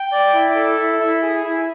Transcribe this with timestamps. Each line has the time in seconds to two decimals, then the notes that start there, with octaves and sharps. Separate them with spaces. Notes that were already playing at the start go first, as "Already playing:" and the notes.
Already playing: G5
0.12 D5
0.34 E4
0.55 A4
0.78 E4
0.99 E4
1.22 G#4
1.44 E4